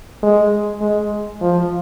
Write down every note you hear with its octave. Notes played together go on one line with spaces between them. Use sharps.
G#3
G#3
F3